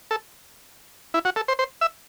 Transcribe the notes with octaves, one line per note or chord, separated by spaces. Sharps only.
A4
E4
F#4
A4
C5
C5
E5